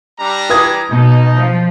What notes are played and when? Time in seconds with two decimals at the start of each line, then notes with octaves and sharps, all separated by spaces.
0.19 G3 D4 A#5
0.50 B4 D#6 G#6
0.90 B2 D#4
1.34 F3